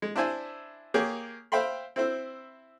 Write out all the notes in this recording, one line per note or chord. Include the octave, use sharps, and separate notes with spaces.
G#3
D4 E4 C5 E5 G#5
A#3 G4 G#4 C#5
C5 E5 F5 G5 B5 C6
C4 E4 C5